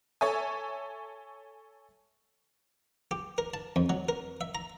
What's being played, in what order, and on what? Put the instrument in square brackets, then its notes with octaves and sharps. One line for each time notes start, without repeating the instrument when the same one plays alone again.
[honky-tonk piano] A4 C#5 E5 G#5
[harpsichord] G4
A#4
A5
F2
F#3
A#4
E5
A#5